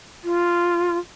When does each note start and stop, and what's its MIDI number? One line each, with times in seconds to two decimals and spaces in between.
0.23 0.97 65